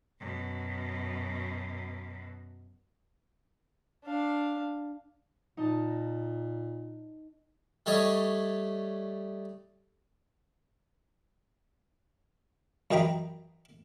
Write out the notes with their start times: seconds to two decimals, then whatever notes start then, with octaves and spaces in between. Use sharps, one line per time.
0.20 F#2 B2
4.05 D4 F5
5.57 A#2 D#4 D#5 A5
7.86 G3 A3 C#5 D#5
12.91 F#2 E3 D#5 G5 A#5 B5